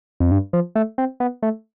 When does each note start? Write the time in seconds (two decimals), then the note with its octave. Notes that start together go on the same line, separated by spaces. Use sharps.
0.20 F2
0.31 G2
0.53 F3
0.75 A3
0.98 C4
1.20 B3
1.43 A3